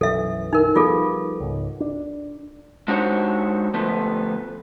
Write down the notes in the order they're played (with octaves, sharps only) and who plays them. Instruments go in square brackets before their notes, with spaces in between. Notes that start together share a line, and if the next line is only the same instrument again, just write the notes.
[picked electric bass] B1 F#2 E3 [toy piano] A4 E5
[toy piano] D#4 A#4
[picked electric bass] F3 G3 B3 [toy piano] F4 G#4 A4
[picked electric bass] C#2 G#2
D4
[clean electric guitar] G#3 D4 D#4 F#4 C5 C#5
D2 F3 A3 B3